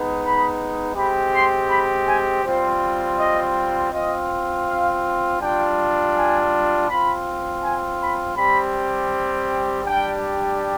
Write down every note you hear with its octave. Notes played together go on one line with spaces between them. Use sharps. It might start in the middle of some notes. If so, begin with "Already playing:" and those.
Already playing: G#3 B3 D#4
B5
G#3 C4 G4 B5
C6
B5
G#5
G3 C4 F4 C5
D#5
C4 F4 D#5
F5
G3 D4 F4 G5
G#5
C4 F4 B5
G#5
B5
G3 C4 G4 B5
G3 D4 G4 G5